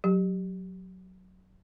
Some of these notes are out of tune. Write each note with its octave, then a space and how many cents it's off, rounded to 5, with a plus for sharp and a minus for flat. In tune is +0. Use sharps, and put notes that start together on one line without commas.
F#3 +0 G4 +0